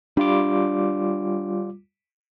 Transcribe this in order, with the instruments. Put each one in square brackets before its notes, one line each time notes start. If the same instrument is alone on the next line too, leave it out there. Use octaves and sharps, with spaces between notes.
[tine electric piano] G3 F4 D6 [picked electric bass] D4